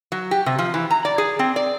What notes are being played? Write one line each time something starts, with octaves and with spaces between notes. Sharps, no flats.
F#3
G4
C3
F3
E3
A#5
D5
G#4
C4
D5